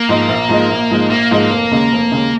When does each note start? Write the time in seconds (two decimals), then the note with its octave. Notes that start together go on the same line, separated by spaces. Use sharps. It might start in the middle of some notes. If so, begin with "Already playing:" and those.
Already playing: A#3
0.09 G#2 F3 G#3 D#4
0.29 A#1
0.49 G#2 F3 G#3 D#4
0.70 A#1
0.90 G#2 F3 G#3 D#4
1.10 A#1 A#3
1.31 G#2 F3 G#3 D#4
1.50 F1
1.71 D#2 C#3 G#3
1.92 F1
2.11 D#2 C#3 G#3